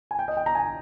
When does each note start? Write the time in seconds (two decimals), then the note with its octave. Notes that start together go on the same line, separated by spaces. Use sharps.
0.11 G#5
0.19 G5
0.28 D#5
0.37 G5
0.46 A#5
0.55 G#5